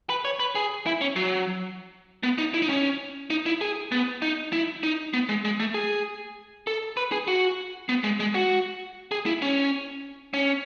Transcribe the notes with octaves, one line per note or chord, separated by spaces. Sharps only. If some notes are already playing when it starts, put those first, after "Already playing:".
B4
C#5
B4
G#4
E4
C#4
F#3
B3
D#4
E4
D#4
C#4
D#4
E4
G#4
B3
D#4
E4
D#4
B3
G#3
G#3
A3
G#4
A4
B4
G#4
F#4
B3
G#3
G#3
F#4
G#4
E4
C#4
C#4